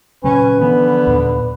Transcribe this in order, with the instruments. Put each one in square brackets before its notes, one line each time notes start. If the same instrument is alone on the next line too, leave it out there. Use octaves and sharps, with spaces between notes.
[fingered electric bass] A#2 C#3 F#3 [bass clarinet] C#4 [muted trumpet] B4
[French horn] D3 [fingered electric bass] E3 F3 [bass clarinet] B3
[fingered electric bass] D#2 A#2 F#3